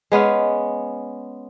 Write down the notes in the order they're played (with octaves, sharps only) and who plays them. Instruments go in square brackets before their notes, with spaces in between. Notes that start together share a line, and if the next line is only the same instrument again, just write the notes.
[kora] G#3 B3 C#4 F5